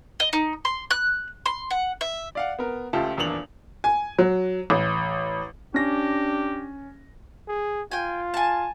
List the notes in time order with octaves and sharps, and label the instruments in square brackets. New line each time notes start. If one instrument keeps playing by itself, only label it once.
[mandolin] D#5
D#4
C6
F#6
C6
F#5
E5
[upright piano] D5 F5 F#5
B3 A#4
C#2 A3 F4 G4 A5
D#1 E2 A#2 D4 F7 F#7
G#5
F#3
A1
[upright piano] C#4 A#6 [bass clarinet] D4 [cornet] G4
[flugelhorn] G#4
[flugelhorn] F4 [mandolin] G5 G#5
[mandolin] G#5 A5